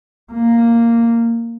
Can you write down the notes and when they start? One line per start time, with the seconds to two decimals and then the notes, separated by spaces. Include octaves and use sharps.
0.33 A#3